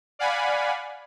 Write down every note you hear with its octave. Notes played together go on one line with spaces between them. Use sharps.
D5 F5 F#5 G#5 B5